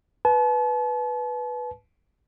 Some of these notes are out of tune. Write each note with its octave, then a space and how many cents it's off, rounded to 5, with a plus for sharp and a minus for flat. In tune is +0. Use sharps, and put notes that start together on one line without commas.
B4 -5 A5 -40